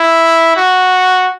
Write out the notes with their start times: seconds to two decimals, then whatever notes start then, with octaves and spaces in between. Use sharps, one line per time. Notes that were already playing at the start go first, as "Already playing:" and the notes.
Already playing: E4
0.56 F#4